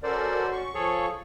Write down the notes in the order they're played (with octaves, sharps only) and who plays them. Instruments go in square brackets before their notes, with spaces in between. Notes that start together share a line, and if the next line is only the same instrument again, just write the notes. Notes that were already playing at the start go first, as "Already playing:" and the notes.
[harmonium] C#4 F#4 [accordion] A4 A#4 D5 [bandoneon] C5
[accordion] C#6
[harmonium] F3 [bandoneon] G#4 A4 C#5